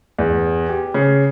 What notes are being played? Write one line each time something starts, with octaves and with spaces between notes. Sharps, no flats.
E2
G4
C#3